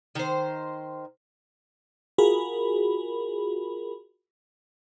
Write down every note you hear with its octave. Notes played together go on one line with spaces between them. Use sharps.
D#3 C5
F4 F#4 G#4 A#4 B5